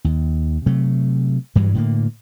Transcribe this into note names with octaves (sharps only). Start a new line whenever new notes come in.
D#2
C3 F#3 A3
G2 E3 F#3 G3
A2 D3 A#3